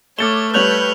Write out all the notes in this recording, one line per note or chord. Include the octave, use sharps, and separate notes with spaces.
A3 C#5 D6 F6 A6 C#7 E7 G7
G3 B4 C#5 F#6 G6 F7 F#7